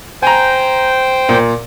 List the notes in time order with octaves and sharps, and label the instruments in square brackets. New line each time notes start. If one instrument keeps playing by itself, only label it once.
[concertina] C5 G5 [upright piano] G#5 A#5
[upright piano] A#2